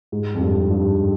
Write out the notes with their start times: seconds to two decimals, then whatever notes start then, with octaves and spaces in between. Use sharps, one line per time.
0.12 G#2
0.35 F2
0.41 G2
0.70 G2